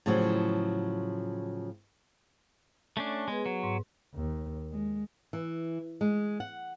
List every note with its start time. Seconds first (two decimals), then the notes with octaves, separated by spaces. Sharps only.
0.06 A2 C#3 F3 F#3
2.97 A3 C#4 D4 C#5
3.28 G#3 B3 G#4 B4
3.46 F#3
3.63 G#2
4.15 D#2
4.72 G#3
5.33 E3
6.01 G#3
6.40 F#5